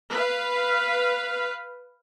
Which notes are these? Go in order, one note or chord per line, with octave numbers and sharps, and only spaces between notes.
B4 F5